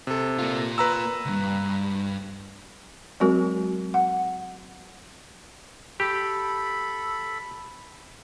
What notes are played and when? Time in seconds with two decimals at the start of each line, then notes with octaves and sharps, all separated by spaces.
0.07 C3 A4
0.39 A#3 F4
0.78 B4 A#5 E6
1.26 C#2 G2
3.20 F#3 G#3 C4 F#4 A#4
3.94 F#5
6.00 G4 A4 B5